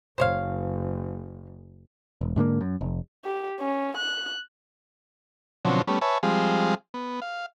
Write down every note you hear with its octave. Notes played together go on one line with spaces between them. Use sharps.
F#1 C5 C#5 F5
E1
G#2 D3 A3 A#3
F#2
F1
G4
C#4
F#6
B2 D3 F3 F#3 C4 C#4
G3 A3 B3 C#4
B4 C#5 E5 G#5 A5
F3 G3 G#3 C4 G#4 F5
B3
F5